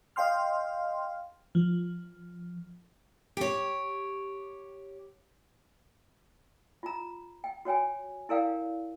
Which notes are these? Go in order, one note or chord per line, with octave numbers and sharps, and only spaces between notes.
D#5 F5 G5 C6 F6
F3
G4 C#5
F4 A#5
G5
F#4 C#5 G5 G#5
E4 A4 A#4 D5 F5 G5